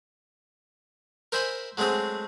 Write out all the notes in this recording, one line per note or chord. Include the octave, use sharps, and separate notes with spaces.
A#4 C5 E5 G#5 B5 C6
F#3 G#3 A3 C4 G#4